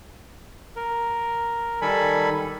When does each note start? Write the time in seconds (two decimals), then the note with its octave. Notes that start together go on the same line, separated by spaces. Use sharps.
0.76 A#4
1.82 D#3 G3 A4 G#5 B5